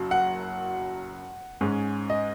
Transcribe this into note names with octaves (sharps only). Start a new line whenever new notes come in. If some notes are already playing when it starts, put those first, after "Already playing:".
Already playing: F#1 F#2 F#3
F#5
G#2 G#3 C#4
D#5